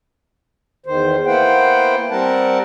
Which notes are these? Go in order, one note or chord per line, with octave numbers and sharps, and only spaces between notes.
E2 D#3 C5
A#3 B3 E4 C5 F#5 G5
G3 C4 A#4 F#5 A5